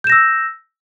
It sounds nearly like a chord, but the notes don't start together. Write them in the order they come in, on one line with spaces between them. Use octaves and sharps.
G6 E7 A#6 E6